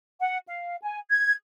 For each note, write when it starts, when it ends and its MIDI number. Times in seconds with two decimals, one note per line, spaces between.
0.20 0.38 78
0.48 0.76 77
0.82 0.98 80
1.09 1.32 92